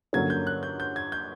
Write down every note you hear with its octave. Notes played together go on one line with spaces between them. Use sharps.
G2 D3 F#3 A#3 C#4 G#6
G6
F#6
G6
G6
G#6
G6